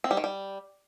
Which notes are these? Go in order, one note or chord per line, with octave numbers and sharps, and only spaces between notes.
C4
G3
D#3
G3